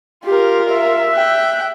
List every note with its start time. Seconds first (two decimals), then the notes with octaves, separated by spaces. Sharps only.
0.25 F4 G4 A#4
0.72 E5
1.14 G5 F#6